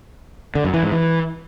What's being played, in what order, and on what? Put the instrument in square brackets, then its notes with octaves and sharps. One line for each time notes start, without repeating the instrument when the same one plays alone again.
[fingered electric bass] D3
F#2
E3
G#2
E3